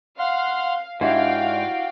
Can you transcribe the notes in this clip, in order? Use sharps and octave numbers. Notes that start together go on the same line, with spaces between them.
F5 F#5 C6 F6
G#2 D4 E4 F#4 G4 D5 F5 G5